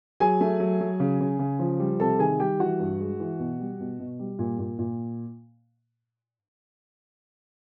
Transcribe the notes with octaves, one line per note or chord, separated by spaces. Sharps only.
F#3 G#4 G#5
A3
F#3
F#3
C#3
C#3
C#3
F3
G3
C3 A4 A5
D#3 G#4 G#5
G3 G4 G5
E3 F#4 F#5
G2
G#3
E3
B2
G3
B2
B2
G3
A#2
A#2
A#2